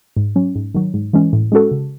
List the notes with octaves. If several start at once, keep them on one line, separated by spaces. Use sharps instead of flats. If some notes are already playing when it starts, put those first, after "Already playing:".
G#2
F#3 C#4
G#2
D#3 F#3
G#2
E3 G#3 C#4
A2
G#3 C#4 F#4 A4
C#3